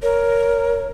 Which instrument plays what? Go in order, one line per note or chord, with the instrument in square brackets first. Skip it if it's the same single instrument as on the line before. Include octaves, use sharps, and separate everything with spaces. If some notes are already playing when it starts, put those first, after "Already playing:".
[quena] A#4 [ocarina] C#5